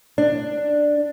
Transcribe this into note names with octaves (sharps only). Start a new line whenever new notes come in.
D4